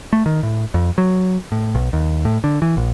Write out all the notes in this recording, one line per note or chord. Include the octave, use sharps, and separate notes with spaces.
A3
D#3
A2
F2
F#3
A2
B1
D#2
A2
D3
E3
A#1